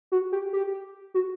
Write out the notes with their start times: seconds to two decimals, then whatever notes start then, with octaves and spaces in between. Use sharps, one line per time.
0.12 F#4
0.32 G4
0.53 G4
1.14 F#4